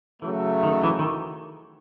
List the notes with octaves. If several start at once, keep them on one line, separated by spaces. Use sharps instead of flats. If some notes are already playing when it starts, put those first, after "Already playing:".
C#3 E3 F#3 A3
D#3
E3
D#3